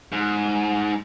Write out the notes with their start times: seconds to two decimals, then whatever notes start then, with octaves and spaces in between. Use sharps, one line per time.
0.12 G#2